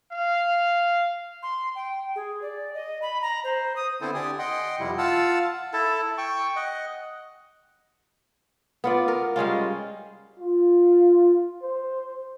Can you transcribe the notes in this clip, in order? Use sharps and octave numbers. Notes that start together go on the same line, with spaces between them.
F5
C6
G5
G#4
D5
D#5
B5
A#5
C5
D#6
D3 B3 C4 E4 A4 C5
D3 G4 D5 G#5 D#6
D#5 F#5 G5 C6
F2 C3 G3 E4
F4 F5 F#5 A5 E6
E4 A4 A5
G5 C#6
D#5 F#5
B3 F4 D5
A#4
G3 G#3 C#4 F4
F4
C5